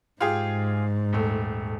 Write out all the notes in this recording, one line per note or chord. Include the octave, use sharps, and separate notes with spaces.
G#2 F4 G4 G#4
D#1 A3